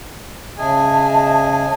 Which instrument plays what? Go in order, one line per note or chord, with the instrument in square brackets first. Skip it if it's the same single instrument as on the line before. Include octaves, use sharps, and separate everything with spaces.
[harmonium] C#3 G#4 G#5 [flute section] D#5 E5 A5